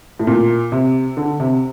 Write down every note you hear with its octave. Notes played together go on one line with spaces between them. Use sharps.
A2
A#2
C3
D3
C3